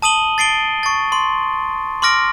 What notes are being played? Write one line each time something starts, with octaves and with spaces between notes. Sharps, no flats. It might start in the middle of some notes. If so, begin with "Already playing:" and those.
A5 D#6 D#7 F#7 G7
A6 C7 D7 G7
C#6 A6
C6
C6 D6 F6 A#6 D7